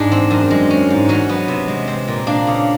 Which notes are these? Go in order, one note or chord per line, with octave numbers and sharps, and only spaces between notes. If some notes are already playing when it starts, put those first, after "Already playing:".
Already playing: G#2 G#3 D4
C4
F#2
G#3
C#4
G#2
F#3 C#4
B3
C3
G#3
C4
A#2
A#3 D4
C#3